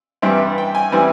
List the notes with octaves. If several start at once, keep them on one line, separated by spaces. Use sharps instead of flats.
G2 E3 G3 C4 E4 E5
G5
G#5
E3 G3 C4 E4